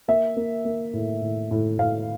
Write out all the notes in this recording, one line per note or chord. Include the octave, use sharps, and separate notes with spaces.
A#3 E5
A#3
A#3
A2
A2
A2
A2 F5